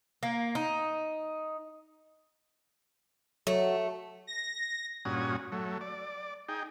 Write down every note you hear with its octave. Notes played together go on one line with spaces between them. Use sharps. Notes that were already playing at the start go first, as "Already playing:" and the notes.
A#3
D#4
F#3 A3
A#6
G2 A#2 C#4 F#4 G#5 D#6
F#3 A3
D5
D#4 G#4 G5